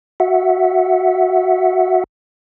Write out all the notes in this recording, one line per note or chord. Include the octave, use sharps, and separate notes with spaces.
F#4 E5 F#5